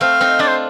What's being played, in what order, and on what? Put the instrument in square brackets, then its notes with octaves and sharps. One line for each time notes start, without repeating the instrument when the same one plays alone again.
[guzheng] A3 C4 [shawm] F5
[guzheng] C4 D#4
[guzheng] D4 F4 [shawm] D5
[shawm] C5